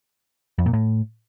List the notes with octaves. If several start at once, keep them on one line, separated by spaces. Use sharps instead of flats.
F2
A#2
A2